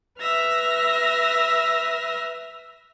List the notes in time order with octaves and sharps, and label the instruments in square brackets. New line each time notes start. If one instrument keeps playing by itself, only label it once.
[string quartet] B4 E5 F6 A#6